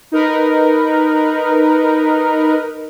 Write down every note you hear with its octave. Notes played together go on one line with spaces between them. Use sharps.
D#4 A#4 B4